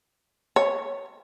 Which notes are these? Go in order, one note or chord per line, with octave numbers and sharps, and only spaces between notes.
C#5